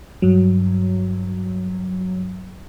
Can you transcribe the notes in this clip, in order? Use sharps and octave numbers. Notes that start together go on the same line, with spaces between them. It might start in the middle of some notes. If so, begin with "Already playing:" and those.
G2 F#3